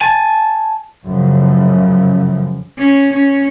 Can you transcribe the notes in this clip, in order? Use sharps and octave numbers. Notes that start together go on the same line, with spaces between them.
G#5 A5
F#2 A2 C#3 F3
C#4
C#4